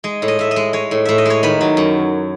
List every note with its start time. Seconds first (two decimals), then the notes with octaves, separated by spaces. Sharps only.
0.04 G#3 D#5
0.22 A2
0.28 D#5
0.39 A2 E5
0.51 D#5
0.56 G#3
0.73 G#3 C#5
0.91 A2
1.05 A2 E5
1.18 D#5
1.25 G#3 C#5
1.43 D#3 B4
1.61 F#3
1.77 F#2